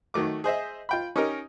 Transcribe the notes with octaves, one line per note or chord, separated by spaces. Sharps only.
D#3 F#3 A3 D6
G#4 C5 D#5 E5
F4 G5 B5
C#4 D#4 G4 A#4